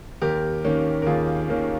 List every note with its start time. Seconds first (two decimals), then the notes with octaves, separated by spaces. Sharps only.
0.22 D#2 G4 A#4
0.65 D#3 A#3 C#4
1.02 A#4
1.06 D#2 F4 G#4
1.49 D#3 A#3 C#4